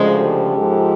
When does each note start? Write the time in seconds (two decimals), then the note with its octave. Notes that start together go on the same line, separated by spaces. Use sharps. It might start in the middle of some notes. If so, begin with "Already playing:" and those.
Already playing: D2 C#3 F3 G#3
0.16 G4 A4
0.57 G#2 F3 G#3